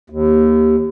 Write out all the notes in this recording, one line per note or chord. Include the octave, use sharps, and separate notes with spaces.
D#2